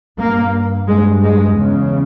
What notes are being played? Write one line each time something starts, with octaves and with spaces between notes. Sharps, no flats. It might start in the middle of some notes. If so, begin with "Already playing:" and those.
G2 A#3
G2 G#3
G#3
E2 C#3